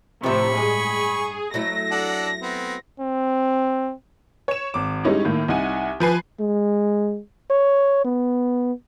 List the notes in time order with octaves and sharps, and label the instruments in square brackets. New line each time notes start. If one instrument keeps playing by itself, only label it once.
[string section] A2 C3 [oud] F3 E5 [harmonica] B5 C#6
[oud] G2 G#3 [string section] G#4
[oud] F#3 A3 E4 [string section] A#6
[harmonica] D4 A4 F#5
B3 C4
[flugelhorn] C4
[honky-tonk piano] C#5 E7
G#1 D6
G3 G#3 C#4 D#4 E4
A2 D#3 A#3
C2 D#4 F#5 G#5 D#7
F3 B4 G#5 C7
[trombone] G#3
C#5
B3